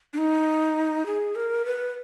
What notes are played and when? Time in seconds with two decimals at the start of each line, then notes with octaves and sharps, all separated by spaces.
0.13 D4
0.18 D#4
1.06 G#4
1.35 A#4
1.65 B4